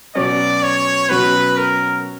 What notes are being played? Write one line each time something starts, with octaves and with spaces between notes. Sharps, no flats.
B2 F#3 C#4 D5
C#5
B2 F#3 C#4 B4
A#4